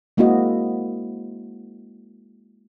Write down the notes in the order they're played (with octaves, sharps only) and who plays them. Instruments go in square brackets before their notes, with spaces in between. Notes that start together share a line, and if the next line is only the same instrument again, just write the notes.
[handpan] G#3 A#3 C4 E4 F#4 D#5